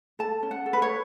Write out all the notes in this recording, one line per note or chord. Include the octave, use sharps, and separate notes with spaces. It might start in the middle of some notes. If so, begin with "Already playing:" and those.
A4 A5
C#4
F#5
A4
B4
C#5